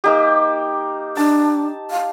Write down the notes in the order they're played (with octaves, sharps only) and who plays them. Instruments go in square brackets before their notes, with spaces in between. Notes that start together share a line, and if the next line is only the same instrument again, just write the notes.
[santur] A#3 D#4 G4
[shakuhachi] D4 [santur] A5
[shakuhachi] F5